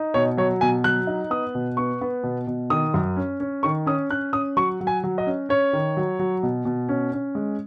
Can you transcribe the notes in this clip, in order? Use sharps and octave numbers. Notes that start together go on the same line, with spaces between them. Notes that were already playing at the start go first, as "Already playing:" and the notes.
Already playing: D#4
B2 C#5
F#3 C#5
B2 G#5
F#3 F#6
D#4
B3 D#6
B2
B3 C#6
B3
B2
B2
D#3 D#6
F#2
C#4
C#4
D#3 C#6
C#4 D#6
C#4 F#6
C#4 D#6
F#3 C#6
F#3
G#5
F#3
D#5
C#4
C#4 C#5
D#3
F#3
F#3
B2
B2
C#4
C#4
G#3